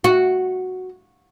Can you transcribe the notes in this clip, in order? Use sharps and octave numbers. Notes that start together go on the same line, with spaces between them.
F#4